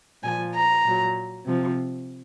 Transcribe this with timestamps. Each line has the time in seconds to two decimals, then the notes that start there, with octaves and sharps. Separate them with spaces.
0.22 A#2 F3 G#5
0.53 A#5
0.84 A#2 F#3
1.46 C3 F3